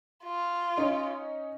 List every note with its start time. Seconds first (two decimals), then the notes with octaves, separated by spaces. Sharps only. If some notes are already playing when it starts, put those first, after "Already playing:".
0.24 F4
0.77 C#4 D#4